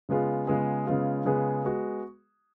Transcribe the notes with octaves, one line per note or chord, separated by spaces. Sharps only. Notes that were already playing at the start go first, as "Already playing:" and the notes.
C#3 G#3 B3 F4 G#4
C#3 G#3 B3 F4 G#4
C#3 G#3 B3 F4 G#4
C#3 G#3 B3 F4 G#4
G#3 B3 F#4